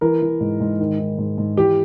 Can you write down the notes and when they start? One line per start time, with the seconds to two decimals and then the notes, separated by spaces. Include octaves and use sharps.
0.01 E3 A#4
0.22 E3
0.41 G#2
0.60 G#2
0.80 D#3
0.99 D#3
1.18 G#2
1.38 G#2
1.57 E3 G4